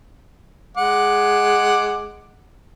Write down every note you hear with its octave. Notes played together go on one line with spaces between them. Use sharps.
G#3 F#5 D6